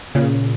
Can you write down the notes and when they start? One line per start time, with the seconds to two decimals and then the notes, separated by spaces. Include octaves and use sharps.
0.15 A#2 C#3